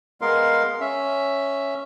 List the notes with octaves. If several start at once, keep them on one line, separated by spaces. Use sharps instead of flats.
G#3 B3 A#4 F5 C6
C#4 E5